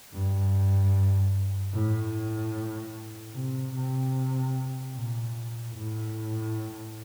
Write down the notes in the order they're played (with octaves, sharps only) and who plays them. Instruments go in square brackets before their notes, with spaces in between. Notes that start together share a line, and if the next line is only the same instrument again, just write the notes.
[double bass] G2
A2
C3
C3
A#2
A2